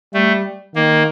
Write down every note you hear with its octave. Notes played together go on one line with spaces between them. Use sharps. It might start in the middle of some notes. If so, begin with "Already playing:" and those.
G3 A3
D#3 A#3